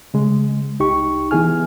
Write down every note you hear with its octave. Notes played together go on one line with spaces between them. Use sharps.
C#3 G#3
C2 D#4 G4 C#6
E3 B3 E4 G#4 G#5 F6